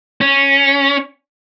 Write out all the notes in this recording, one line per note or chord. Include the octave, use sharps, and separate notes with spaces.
C#4